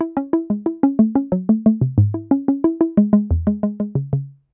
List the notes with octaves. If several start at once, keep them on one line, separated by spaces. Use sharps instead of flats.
E4
C#4
E4
G#3
E4
C#4
A3
C#4
F#3
A3
A3
C3
G#2
E4
C#4
C#4
E4
E4
G#3
G#3
E2
G#3
G#3
G#3
C#3
C#3